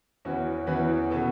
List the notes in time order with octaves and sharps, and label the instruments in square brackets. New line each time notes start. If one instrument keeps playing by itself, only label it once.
[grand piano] E2 E3 C#4 F#4 B4
E2 E3 C#4 F#4 B4
B2 B3 A4